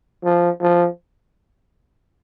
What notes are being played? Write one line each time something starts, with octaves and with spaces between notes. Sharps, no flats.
F3
F3